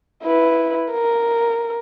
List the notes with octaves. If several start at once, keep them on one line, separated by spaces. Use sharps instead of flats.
E4 B4
A#4